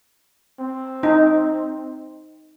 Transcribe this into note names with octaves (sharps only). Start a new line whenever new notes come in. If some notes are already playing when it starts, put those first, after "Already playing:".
C4
D#4